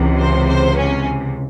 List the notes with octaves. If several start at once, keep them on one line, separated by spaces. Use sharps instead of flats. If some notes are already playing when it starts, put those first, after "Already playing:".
Already playing: C#2 C3 E3
C5
C5
C#4